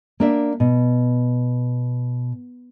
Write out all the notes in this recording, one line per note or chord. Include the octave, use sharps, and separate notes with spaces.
A#3 D4 E5
B2